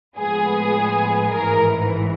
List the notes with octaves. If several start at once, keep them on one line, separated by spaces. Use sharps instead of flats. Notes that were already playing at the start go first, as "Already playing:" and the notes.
A2 F3 G#3 B3 G#4
A1 G#2 E3 A#4